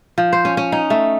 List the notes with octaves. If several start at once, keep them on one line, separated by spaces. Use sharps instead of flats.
F3
C5
C#4
C#4
D#4
A3